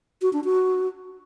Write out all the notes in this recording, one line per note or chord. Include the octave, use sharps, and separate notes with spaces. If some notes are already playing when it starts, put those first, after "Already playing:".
F#4
D4
F#4